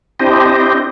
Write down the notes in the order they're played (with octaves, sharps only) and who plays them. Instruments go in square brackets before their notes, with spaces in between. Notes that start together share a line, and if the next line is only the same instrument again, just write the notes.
[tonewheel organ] C4 D4 E4 G4 C5 D#5